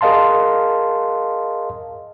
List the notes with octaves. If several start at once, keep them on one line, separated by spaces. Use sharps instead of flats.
G#4 A#4 D#5 F5 A5 C6